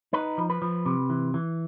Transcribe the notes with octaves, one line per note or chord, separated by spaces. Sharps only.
D#4 B4
F3
B4
F3
C3
E3
E3